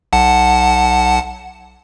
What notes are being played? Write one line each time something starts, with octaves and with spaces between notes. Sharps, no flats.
B1 F#5 A5